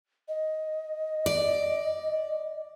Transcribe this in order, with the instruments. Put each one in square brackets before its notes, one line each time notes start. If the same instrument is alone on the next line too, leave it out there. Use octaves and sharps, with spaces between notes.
[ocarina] D#5
[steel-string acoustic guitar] D5